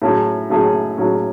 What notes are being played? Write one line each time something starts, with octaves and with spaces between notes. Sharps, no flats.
A2 F#3 C#4 G#4
A2 F#3 C#4 G#4
A2 F#3 C#4 G#4